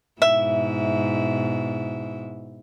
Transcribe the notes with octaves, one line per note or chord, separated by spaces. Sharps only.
G#2 B2 E4 E5